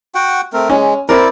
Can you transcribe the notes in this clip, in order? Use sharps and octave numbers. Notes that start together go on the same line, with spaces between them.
F#4 F#5 G5
A3 C4 A#4
G#3 C#4
C4 E4 A#4 D5